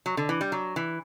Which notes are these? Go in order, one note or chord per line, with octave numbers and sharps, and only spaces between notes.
F#3
D3
E3
G3
F#3
E3